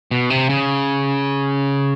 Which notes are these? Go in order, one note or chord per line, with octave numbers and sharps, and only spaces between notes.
B2
C3
C#3